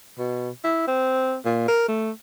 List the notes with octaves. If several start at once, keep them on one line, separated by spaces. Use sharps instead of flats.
B2
E4
C4
A#2
A#4
A3